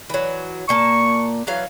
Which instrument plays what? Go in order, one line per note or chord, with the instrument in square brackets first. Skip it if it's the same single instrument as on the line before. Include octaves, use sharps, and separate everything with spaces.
[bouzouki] E3 F#3
[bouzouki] A#2 A#3 A5 [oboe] C#6
[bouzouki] E3 F#3 F5